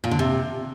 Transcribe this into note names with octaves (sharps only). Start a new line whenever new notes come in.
A#2
D3
C3